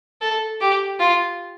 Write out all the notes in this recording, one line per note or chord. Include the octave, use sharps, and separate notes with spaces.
A4
G4
F4